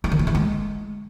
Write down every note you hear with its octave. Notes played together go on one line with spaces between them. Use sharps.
G3
D#3
E4
E3
G#3